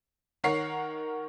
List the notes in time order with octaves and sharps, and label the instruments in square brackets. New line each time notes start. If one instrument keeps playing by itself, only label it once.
[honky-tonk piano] D#3 A#4 C#5 F#5 C7